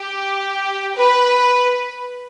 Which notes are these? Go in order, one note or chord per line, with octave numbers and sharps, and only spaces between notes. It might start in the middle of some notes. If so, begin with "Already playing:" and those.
Already playing: G4
B4